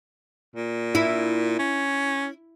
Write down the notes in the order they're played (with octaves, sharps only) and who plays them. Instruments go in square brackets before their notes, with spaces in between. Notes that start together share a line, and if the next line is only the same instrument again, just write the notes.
[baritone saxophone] A#2
[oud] E4
[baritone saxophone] C#4